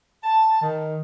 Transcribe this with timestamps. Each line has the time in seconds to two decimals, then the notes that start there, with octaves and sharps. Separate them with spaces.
0.23 A5
0.60 D#3